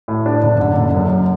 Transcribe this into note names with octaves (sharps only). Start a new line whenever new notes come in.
A2
D4
F#1
D3
F#1
F#2